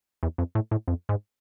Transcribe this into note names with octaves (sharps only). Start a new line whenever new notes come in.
E2
F2
A2
A2
F2
G#2